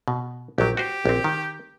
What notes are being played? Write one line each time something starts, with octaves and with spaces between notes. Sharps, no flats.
B2
A#1 F#3 G4
F#4 G4 B4 C5
A#1 C4
D#3